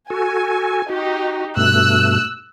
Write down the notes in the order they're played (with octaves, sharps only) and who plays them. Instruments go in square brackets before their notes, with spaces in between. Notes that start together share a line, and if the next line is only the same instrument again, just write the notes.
[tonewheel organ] F#4 A4 [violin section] G#5
[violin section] D#4 G4 [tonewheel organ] F#4
[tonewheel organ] G2 B2 A3 [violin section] E6 F#6